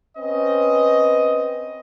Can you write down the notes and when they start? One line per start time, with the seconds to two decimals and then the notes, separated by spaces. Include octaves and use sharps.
0.18 C4 C#4 B4 D#5